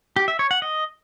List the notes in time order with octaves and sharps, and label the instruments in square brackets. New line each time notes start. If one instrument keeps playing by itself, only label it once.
[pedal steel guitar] G4
E5
C#5
F#5
D#5